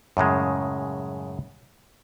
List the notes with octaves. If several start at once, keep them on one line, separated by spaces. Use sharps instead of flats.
F#2 A2 C#3 G#3